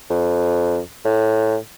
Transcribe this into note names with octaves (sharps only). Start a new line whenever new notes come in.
F2
A2